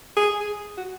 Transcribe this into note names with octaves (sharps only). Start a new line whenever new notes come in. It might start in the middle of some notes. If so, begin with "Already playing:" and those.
G#4
G#4
F#4